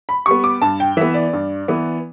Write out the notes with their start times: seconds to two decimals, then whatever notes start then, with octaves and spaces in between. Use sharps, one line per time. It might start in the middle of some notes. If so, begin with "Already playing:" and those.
0.09 B5
0.26 G3 B3 C#6
0.44 D6
0.62 G2 A5
0.80 G5
0.97 E3 B3 E5
1.14 D5
1.33 G2
1.68 E3 B3